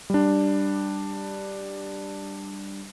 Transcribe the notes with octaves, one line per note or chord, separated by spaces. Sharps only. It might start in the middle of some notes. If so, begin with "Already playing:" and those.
G3 D4